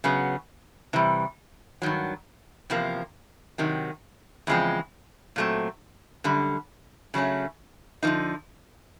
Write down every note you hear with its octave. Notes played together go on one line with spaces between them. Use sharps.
C#3 F#3 B3
C3 E3 G3
G2 D#3 F#3
E2 C3 F3 A#3
C3 D#3 F#3
E2 C#3 F3 G#3 C4
A#2 F#3 A3 C4
F#2 D3 G3
C#3 F#3 A3 C#4
D3 F3 A#3 D#4